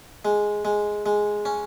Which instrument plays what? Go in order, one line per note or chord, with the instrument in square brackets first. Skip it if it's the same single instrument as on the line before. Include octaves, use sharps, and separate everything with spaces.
[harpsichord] G#3
G#3
G#3
C#4